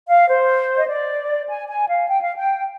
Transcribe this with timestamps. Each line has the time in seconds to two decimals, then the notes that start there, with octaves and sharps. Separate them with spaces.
0.08 F5
0.29 C5
0.77 D#5
0.88 D5
1.48 G#5
1.68 G#5
1.88 F5
2.09 G5
2.22 F5
2.36 G5